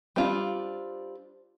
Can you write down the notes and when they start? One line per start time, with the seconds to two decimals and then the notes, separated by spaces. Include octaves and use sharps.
0.16 G3 C4 D4 F4